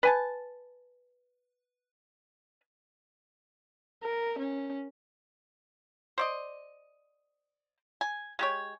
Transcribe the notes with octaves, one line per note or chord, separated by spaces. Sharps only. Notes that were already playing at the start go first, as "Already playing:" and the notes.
B4 G#5 A5
A#4
C#4
C5 D5 D#5
G#5
G#3 G4 C#5